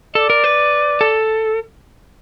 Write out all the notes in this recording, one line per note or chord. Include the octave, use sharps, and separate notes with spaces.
A4 D5
A#4
B4
A4